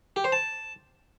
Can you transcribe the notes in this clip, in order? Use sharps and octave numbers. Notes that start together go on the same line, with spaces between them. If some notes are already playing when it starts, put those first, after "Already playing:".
G4
C5
A5